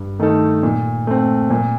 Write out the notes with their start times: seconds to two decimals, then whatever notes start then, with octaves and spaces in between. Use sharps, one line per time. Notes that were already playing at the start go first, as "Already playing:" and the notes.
Already playing: G2
0.19 D#3 A3 D#4 A4
0.63 A#2
1.07 A3 C4
1.50 A#2